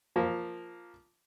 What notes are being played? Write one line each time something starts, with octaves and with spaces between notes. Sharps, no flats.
F3 A#3